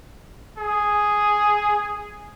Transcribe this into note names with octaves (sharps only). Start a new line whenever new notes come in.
G#4